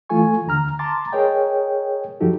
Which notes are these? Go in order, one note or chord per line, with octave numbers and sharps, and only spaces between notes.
E3 A3 F4 A4 G#5 C#6
D#2 D3 A#5 F6
A5 A#5 C6 D6 A6
G#4 A#4 C#5 D#5 G5
F#2 F3 D#4 F#4 G4 A4